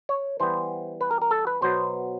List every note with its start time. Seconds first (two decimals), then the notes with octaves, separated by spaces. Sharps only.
0.09 C#5
0.40 E3 G3 B3 C5
1.01 B4
1.11 A#4
1.22 A#4
1.31 A4
1.47 B4
1.62 B2 F#3 B3 C5